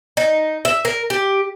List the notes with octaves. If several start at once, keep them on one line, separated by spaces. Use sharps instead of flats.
D#4
E5
A#4
G4